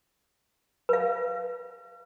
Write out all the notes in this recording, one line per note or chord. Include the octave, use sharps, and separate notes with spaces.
B4 F5